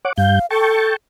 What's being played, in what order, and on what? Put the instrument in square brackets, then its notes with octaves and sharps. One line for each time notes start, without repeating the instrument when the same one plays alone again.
[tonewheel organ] C#5 F#5 D6
[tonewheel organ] G2 G6 [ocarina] F5
[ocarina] A4 [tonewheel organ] G5 A5 C#6